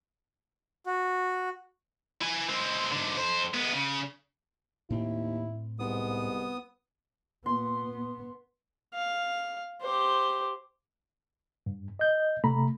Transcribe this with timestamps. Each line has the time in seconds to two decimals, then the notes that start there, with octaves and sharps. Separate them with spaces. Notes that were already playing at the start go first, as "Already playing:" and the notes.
0.86 F#4
2.21 E4 G#5
2.49 G#3 C4
2.91 G#2 D3
3.17 F2 C5
3.54 G#3 B3
3.72 C#3
4.90 D#2 A2 C4 E4
5.79 C2 G#2 B3 D#6
7.46 A#2 B3 C6
8.94 F5
9.81 G4 C5
11.66 G2
11.99 D#5 G6
12.44 C3 A3 A#5 B5